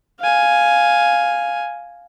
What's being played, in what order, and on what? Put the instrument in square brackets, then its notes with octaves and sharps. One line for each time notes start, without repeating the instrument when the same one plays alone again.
[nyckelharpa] F5 G#5